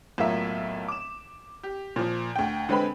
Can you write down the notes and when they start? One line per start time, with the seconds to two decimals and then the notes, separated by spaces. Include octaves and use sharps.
0.18 B1 A2 A#3 F4 E5 B6
0.88 D6 E7
1.63 G4
1.96 A#2 F3
2.36 D2 G5
2.69 D3 G#3 C4 B4 G5 B5